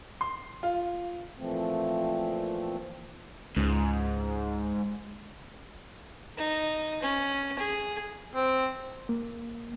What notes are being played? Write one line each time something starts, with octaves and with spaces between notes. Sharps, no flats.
C6
F4
A#2 E3 F3 A3 C4
C#2 G#2
D#4
C#4
G#4
C4
A#3